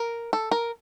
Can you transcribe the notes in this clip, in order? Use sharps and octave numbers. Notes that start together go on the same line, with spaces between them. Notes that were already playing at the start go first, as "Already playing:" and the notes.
Already playing: A#4
A4
A#4